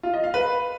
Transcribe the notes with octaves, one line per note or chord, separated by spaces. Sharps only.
F4
D#5
F5
B4